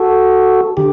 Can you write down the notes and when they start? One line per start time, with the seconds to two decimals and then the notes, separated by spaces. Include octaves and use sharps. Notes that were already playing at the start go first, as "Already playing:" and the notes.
Already playing: F#4 A4
0.77 D3 G4